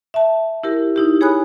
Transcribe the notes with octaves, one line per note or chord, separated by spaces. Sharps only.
E5 A5
E4 G4 A#4
D#4 E4 G4
G#4 C#5 G#5 B5 D#6 F#6